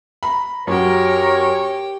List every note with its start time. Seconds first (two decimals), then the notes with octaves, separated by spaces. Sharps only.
0.23 A#5 B5
0.67 F#2 F#4 G4 A#4 C#5 G5